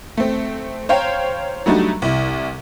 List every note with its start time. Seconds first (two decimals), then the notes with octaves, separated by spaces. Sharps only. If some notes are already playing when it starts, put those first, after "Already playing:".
0.17 A3 C4
0.89 C5 C#5 F5 G5 A#5
1.66 F#3 G3 A3 D4 D#4 F#4
2.02 C2 E4